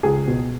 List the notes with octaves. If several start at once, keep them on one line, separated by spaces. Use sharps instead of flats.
C#2 G#4
B2